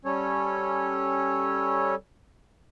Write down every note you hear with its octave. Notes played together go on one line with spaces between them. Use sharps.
G3 C#4 A4 C#5